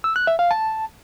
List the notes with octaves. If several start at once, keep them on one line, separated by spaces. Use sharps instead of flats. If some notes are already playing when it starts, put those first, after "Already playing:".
E6
F#6
E5
F5
A5